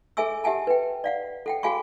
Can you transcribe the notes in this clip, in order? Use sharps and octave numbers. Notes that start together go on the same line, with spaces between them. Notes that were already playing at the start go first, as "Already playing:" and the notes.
G#4 A4 E5 G#5 C#6 E6
G4 E5 F#5 G#5 A5
B4 G5
D5 F5 F#5
A4 F#5 G5
F#4 G#4 F5 G#5 B5 C#6